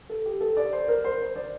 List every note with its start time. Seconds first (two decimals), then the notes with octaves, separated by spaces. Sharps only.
0.10 A4
0.26 G4
0.41 A4
0.57 D5
0.73 C5
0.88 A#4
1.04 C5
1.20 C5
1.36 D5